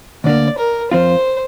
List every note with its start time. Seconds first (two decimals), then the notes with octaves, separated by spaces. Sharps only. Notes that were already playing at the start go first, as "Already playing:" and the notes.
0.24 D2 D3 A#3 D5
0.58 A#4
0.91 F2 F3 C4 F4 C5